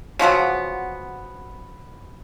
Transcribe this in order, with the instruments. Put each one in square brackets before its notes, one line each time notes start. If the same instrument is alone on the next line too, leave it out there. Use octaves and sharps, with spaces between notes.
[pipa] C#3 F3 F#3 B3